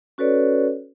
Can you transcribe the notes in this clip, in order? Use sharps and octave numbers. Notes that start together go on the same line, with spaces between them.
C#4 F#4 A4 B4 C#5 D5